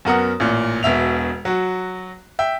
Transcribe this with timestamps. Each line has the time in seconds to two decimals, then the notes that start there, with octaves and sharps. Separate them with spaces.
0.05 F#2 B3 A#4 F#5 D#6
0.40 A1 A#2
0.83 E1 B2 E5 F7
1.45 F#3 F#4
2.39 E5 G5